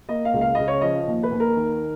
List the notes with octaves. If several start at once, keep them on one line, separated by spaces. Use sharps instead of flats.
A#3 D#5
F5
C#2
F5
C#3 D#5
C#5
F3 D#5
D#2
B4
D#2
A#4
D#3